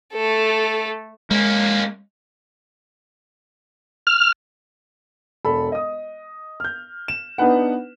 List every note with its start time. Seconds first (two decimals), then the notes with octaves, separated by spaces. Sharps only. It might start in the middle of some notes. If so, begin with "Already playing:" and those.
0.14 A3 A4
1.31 G#3 A#3 C#4
4.07 F6
5.45 E1 A4 B5
5.72 D#5 D#6
6.60 F6 G6
7.08 E7
7.38 B3 D4 D#4 B4 F#5